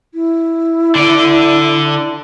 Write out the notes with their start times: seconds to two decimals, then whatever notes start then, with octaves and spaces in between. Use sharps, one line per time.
0.14 E4
0.95 D3 D5